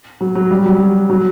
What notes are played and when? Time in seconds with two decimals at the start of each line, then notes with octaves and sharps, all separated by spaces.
0.21 F#3
0.35 F#3
0.51 G3
0.66 F#3
0.80 F#3
1.10 F#3